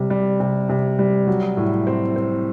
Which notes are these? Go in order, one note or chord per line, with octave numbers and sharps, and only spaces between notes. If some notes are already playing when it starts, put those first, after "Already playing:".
Already playing: C3 G3
G3
C3
C3
G3
F#3
A2
C4
C4